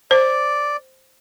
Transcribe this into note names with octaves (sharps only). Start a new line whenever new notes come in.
C5 D5